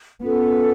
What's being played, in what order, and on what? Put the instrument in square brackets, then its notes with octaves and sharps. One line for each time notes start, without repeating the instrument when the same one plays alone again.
[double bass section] B3 [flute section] C#4 F4 A4